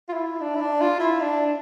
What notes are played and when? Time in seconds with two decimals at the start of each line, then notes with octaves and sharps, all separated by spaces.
0.09 F4
0.14 E4
0.41 D4
0.55 E4
0.61 D4
0.81 F4
1.00 E4
1.21 D4
1.47 D4